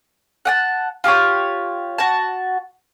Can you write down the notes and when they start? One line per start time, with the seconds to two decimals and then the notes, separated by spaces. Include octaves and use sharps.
0.45 F#5 G5 A5
1.04 F4 G4 A4 C#5
1.98 F#4 A5